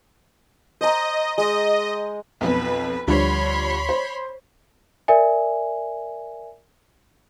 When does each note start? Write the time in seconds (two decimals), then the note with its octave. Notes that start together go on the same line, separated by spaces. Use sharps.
0.81 C5 D#5 A#5
1.38 G#3 D#5
2.41 B1 F2 B4
3.08 D2 D3 F3 G3 C#5 B5 C6
3.89 C5
5.08 A#4 D5 E5 G#5